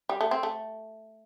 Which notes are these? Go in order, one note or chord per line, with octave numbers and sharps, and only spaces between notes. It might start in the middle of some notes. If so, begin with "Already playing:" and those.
G3
A3
C4
A3